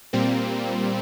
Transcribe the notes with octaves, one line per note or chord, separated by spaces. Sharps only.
A#2 G3 A#3 C4